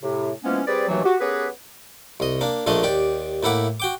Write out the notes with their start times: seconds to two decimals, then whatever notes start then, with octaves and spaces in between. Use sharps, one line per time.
0.02 A2 C3
0.44 E3 F3 G#3 A#3 B3 C#4
0.67 G3 C4 G#4 B4 D5
0.88 D#2 B2 E3 F#3 A3
1.04 F#4 G4
1.20 B3 C#4 G4 G#4 A#4 B4
2.20 C2 D#5
2.41 A#3 D4
2.66 A#1 A#2 A3 D4 D#5
2.83 D#2 G4 D5
3.43 A2 A#3 E4 F#5 D6
3.80 F#4 G5 D6